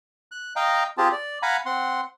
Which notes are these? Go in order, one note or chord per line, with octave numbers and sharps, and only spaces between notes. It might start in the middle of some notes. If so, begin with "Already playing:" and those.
F#6
D#5 F5 G5 A#5
C4 F4 G4 G#4 A5
D5
F5 F#5 G#5 A#5 B5
C4 F#5 C6